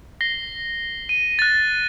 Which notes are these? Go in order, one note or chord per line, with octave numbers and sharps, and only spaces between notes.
A#6 C7 G7
D#7
F#6 A6